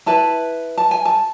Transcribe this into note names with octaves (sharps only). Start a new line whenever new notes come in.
E4 B4 A5
A5
G#5
A5